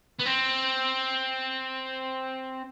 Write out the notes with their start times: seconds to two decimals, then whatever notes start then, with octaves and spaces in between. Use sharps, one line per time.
0.19 B3
0.25 C4